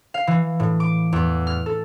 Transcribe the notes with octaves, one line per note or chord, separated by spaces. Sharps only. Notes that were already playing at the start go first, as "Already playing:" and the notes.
F5
E3
A2
D6
E2
F6
A4